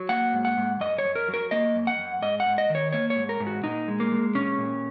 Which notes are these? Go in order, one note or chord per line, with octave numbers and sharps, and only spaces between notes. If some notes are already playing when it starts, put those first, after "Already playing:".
Already playing: F#3
A#3 F#5
G#2
F#5
G#2
F#2 D#5
C#5
F#2
A#4
F#3
A#4
A#3 D#5
F#2
F#5
F#2
G#2 D#5
F#5
G#2
D#5
D#3
C#5
A#3 C#5
C#5
G#2
A#4
G#2
F#4
A#2 D#4
G#3
A#3
G#3
A#2 C#4
A#2